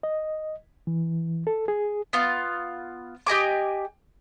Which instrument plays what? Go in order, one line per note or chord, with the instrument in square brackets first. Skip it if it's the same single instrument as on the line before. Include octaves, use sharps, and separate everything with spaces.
[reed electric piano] D#5
E3
A4
G#4
[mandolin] B3 F4
G4 D#5 G#5 D6